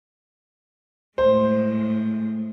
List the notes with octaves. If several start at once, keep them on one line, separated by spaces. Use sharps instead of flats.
A2 G#3 C5